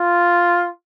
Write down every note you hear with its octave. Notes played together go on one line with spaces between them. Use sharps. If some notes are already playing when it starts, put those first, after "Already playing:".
Already playing: F4